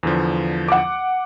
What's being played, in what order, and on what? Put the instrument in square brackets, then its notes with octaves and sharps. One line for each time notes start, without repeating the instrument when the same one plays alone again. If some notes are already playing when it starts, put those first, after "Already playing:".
[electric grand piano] E2 D3 F3
[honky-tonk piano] F#5 D6